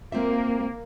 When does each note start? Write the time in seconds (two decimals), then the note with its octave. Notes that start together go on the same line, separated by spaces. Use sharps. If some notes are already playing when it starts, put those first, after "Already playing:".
0.12 A#3 C4 F4 E5